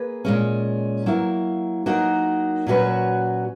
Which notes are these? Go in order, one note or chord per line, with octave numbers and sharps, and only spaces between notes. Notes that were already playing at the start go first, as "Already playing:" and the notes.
Already playing: A#3 G#4 B4
A#2 G#3 C#4
F#3 A#3 E4
F#3 A#3 D#4 F#4 A#4
A#2 F#3 C#4 F#4 B4